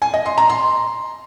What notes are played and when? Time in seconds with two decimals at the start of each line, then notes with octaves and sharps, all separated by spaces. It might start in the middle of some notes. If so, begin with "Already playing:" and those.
0.02 G#5
0.14 D#5
0.26 C6
0.38 A#5
0.50 C6